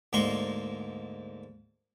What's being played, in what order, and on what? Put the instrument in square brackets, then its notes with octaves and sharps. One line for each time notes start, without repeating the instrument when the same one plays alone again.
[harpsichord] D2 G#2 A#3 A#5 C6 C#6